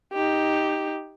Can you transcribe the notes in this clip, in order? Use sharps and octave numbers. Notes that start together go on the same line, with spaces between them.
D#4 G4